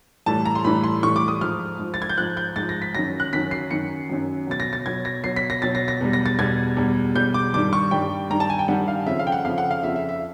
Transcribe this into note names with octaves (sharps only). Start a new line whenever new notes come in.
A2 E3 G3 A5
A#5
C6
A2 E3 G3 B5
C6
A2 E3 G3 C#6
D6
D#6
G#2 F3 F6
G#2 F3
A6
G#6
G6
G#2 F3 F#6
G6
G#2 F3 A6
A#6
B6
F#2 D#3 F#3 A#6
F#6
F#2 D#3 F#3 B6
C7
F#2 D#3 F#3 C#7
F#2 D#3 F#3
B2 F#3 A6
A#6
A6
B2 F#3 G#6
A#6
B2 F#3 C7
B6
A#6
B2 F#3 A6
A#6
A#6
E2 B2 G3
A#6
A6
E2 B2 G3 G#6
E2 B2 G3
E2 B2 G3 G6
D6
G2 D#3 G3 D6
C#6
G2 D#3 G3 G5
G2 D#3 G3 A#5
A5
G#5
G5
G2 D#3 G3 F#5
F5
F2 C#3 F3 E5
F5
G5
F#5
F2 C#3 F3 F5
F#5
F5
F2 C#3 F3 E5
E5
E5